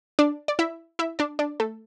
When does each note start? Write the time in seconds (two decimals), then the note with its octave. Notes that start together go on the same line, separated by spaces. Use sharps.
0.19 D4 D5
0.48 D5
0.59 E4 E5
0.99 E4 E5
1.19 D4 D5
1.39 D4 D5
1.60 A3 A4